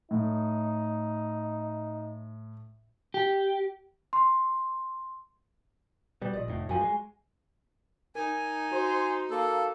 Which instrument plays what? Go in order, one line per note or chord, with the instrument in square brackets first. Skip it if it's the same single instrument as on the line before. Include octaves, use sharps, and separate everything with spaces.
[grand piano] A2 [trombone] D#4
[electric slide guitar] G4
[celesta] C6
[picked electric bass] B2 G3
[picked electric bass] A#1 [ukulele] D5 D#5
[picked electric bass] F1 A2
[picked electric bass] F#2 F3 [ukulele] F#4 G#5
[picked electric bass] G#3
[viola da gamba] D#4 [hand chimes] A#4 [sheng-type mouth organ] G#5
[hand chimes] F#4 [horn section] C5
[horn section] A#3 [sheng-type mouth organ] A4